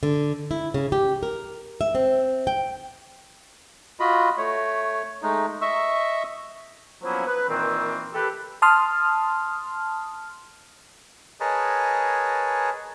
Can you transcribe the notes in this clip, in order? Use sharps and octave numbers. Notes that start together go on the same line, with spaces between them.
D3
E4
C#3
G4
A#4
E5
C4
G5
F4 F#4 D#5 B5
A3 C#5
G#3 A3 D#4
D#5 E5 C#6 E6
F3 F#3 A#3 B3 C#4 E4
B4
A#2 D#3 E3 C4
G4 A4 B4
A5 C6 D#6 F6
G#4 A#4 B4 C#5 D#5 A5